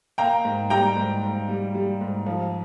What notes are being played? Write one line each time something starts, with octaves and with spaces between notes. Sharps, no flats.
A#3 G5 A#5
G#2
G3 G5 A#5
G#2
G#2
G3
G3
G#2
F3